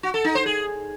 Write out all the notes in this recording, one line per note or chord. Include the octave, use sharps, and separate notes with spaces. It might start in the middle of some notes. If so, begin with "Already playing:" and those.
F#4
A4
D#4
C5
G#4